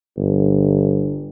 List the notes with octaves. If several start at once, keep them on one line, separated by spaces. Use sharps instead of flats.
G1